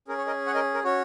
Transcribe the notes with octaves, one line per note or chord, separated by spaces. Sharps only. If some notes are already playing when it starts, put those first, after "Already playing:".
C#4 G#4 A#4
C#5
A#4 D#5
C#5 F#5
A#4 D#5
A#4
C#4 F#4 C#5